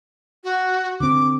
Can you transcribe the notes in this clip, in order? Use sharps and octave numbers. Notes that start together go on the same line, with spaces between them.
F#4
D3 C4 D6